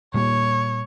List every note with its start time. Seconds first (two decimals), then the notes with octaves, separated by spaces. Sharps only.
0.14 A#2 G3 A#3 C#5